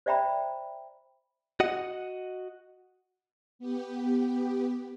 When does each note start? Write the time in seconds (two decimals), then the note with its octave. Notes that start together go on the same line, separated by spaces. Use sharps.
0.06 C5 D5 E5 G5 A#5 B5
1.60 F#4 D#5 F#5
3.59 B3 G4